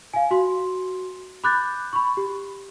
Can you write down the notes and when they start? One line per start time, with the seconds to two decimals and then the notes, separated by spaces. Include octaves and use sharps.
0.14 F5 G#5
0.31 F#4 C6
1.44 B5 D6 F#6 G6 A6
1.93 B5 C#6
2.17 G4